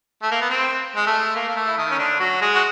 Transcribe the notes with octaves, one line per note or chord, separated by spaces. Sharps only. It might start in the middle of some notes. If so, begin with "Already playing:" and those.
A3
A#3
B3
C4
G#3
A3
A#3
A#3
A3
E4
D#3 D#4
C#4
D3 D4
F#3 F#4
G#3 G#4
F#4